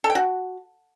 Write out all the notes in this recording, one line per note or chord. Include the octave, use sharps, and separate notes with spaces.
A4
G5
F#4